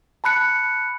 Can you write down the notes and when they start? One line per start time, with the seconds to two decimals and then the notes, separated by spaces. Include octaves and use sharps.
0.24 A5 B5 F#6 C#7